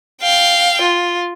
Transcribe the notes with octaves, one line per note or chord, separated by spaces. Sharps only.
F5 G5
F4